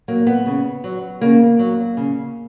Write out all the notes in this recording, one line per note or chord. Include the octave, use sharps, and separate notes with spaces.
F#3 A#3
B3
C#3
F#3
C#3 A#3
F#3
C#3